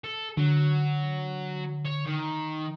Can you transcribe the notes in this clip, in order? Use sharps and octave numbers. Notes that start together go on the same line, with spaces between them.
A4
D3 F#3
C#5
D#3